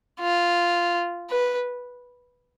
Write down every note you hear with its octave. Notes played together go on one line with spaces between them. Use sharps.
F4
B4